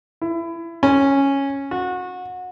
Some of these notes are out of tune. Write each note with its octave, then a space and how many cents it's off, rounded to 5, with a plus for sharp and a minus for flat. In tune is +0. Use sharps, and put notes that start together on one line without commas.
E4 +25
C#4 -5
F#4 -25